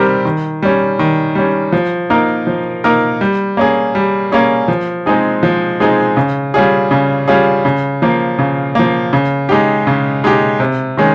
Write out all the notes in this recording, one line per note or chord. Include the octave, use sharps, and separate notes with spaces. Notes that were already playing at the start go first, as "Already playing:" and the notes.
Already playing: D#3 G3 C4 G4 A#4
D#3
G3 C#4
D#3
G3 C#4
F3
A#3 D#4 A#4
F3
A#3 D#4 A#4
G3
A#3 C#4 G#4
G3
A#3 C#4 G#4
F3
G#3 C4 D#4 G#4
F3
G#3 C4 D#4 G#4
C#3
G3 C#4 F4 G#4
C#3
G3 C#4 F4 G#4
C#3
F3 A#3
C#3
F3 A#3
C#3
G#3 D#4 G4
C#3
G#3 D#4 G4
C3
D#3 G#3 C#4